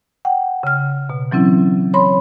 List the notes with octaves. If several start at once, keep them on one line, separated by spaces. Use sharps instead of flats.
F#5 G5
C#3 F6
B2
E3 F#3 C4 C#4 E4
C#5 B5 C6